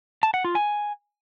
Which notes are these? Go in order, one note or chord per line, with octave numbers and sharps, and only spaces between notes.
A5
F#5
F4
G#5